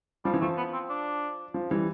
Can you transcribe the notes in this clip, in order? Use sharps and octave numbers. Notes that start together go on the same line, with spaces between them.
F3 G3
E3
F3 A3
B3
C4
D4
F3
E3 G3